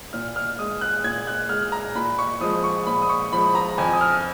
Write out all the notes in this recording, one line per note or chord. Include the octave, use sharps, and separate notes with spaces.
A#2 F6
F6
G#3 D#6
F#6
A#2 G#6
F#6
G#3 F6
A#5
A#2 B5
C#6
F3 G#3 D#6
C#6
A#2 B5
D#6
C#6
F3 G#3 B5
A#5
F2 G#5
D#6
F6